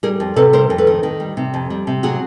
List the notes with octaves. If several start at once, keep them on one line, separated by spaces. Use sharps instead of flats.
G3 G#4 A#4
F2
C3 A4 B4
G3 A#4 C5
F2
A4 B4
D#3
D#3
G3
C3
F2
G3
C3
F#3 F#4 G#4